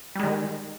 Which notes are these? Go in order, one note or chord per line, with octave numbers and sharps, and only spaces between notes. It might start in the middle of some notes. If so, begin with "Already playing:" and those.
D#3 G3 G#3